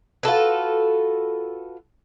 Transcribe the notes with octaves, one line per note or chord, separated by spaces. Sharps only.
F4 F#4 A4 B4